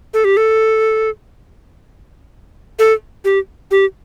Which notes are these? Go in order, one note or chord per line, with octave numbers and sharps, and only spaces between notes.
A4
G4
A4
A4
G4
G4